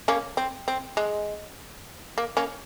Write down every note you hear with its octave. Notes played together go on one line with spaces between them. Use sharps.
A#3 C#4
C4
C4
G#3
A#3
A#3 C#4